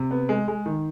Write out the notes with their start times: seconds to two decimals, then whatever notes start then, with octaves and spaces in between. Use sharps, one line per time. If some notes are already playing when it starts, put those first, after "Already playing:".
Already playing: C3
0.11 B3
0.29 G#3
0.48 G#3
0.66 D#3